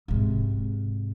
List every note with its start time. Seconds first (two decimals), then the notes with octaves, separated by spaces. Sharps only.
0.08 G#2 C3